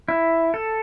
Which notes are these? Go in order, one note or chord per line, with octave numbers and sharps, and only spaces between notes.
E4
A4